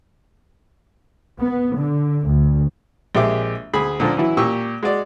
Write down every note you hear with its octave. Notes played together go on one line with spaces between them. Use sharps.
B3
D3
D2
A#1 G#3 G4 E5 D6
D2 G#4 B5
A#2 D3 F3 A#3
E3 F#3 E4
A#2 G4 C#6 E6
G#3 F#4 D5